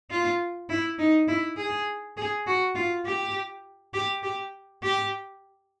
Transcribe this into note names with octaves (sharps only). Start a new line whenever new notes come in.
F4
E4
D#4
E4
G#4
G#4
F#4
F4
G4
G4
G4
G4